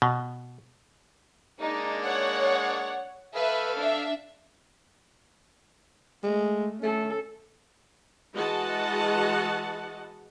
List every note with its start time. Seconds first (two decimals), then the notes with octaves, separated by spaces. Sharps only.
0.02 B2
1.60 G#3 A#3 D4 D#4
2.05 C#5 F#5
3.36 A4 B4 E5 F5
3.79 D4 E5
6.24 G#3 A3
6.83 A3 C#4 A4
8.35 E3 G#3 F#4 D#5 F#5 A5